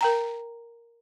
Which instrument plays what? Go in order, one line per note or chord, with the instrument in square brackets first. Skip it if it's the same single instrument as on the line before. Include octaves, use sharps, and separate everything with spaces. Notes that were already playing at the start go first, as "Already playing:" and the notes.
[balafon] A#4 G5 A#5